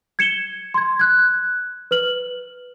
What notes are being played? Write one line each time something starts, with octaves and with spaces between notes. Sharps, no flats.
G#6 C#7 E7 G7
C6 G#6
F#6 G#6
B4 F6 F#7